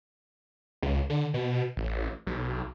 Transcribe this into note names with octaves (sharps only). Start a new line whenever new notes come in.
C#2
D3
B2
A1
B1